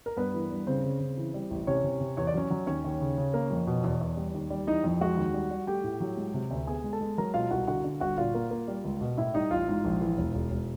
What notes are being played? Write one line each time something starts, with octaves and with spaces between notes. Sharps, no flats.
A#4
G2 B3 B4
E3
G2
C#3 C4 C5
C#3
C#3
E3
G3
A1
C3 C#4 C#5
C3
C3
E2 C#5
D5
F#3 C#4 C#5
F#3
D#2 C#4 C#5
D#2
C#3
C#3
A#3
F2
B2
E2
E2
G3
D#2
G3
E3 D#4 D#5
F2
G#3 F#4 F#5
D#2
G3
G3
A3 G4 G5
A2
F#3
G#3
C3
D2
B3 G#4 G#5
G#3
A4 A5
G#3
F#3 A#4 A#5
B2 F4 F5
C2 F#4 F#5
D3 F#4 F#5
D3
G1 F#4 F#5
A#2 F4 F5
A#3
A#3
G3
C#2
B2
A2 E4 E5
G3 D#4 D#5
A1 F4 F5
G#2
A#1
E3
E1
E1
E1